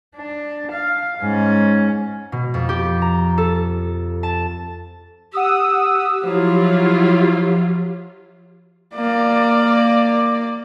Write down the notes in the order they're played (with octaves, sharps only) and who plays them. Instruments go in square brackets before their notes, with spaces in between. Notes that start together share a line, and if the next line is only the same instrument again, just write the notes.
[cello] D4
F5
G#2 C#4
[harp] B2
F2
G4
A#5
A4
A5
[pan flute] G4 [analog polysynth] F#5 D#6 E6
[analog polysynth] F3 [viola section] F#3 E4 F4
[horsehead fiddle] A#3 D5